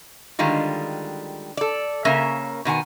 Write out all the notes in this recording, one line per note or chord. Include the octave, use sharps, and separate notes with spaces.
D3 D#3 G3 G#3 F4
A4 D5
C#3 A#3 C#4 A#4 E5
B2 D#3 F#5 G#5